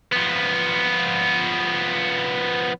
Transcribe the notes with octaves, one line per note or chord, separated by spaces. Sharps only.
F3 B3